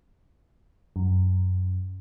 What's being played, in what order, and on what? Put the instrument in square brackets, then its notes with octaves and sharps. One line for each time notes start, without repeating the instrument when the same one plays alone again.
[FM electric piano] F#2